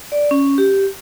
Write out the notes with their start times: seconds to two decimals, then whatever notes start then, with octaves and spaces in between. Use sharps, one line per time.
0.12 D5
0.31 C#4
0.58 G4